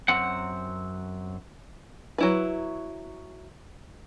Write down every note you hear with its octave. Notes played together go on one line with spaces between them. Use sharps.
F#2 C4 F#5
F#3 E4 B4